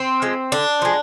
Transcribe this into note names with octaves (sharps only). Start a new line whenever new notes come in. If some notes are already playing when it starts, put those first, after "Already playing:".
Already playing: C4
F3 G#3
D3 D4
F3 G#3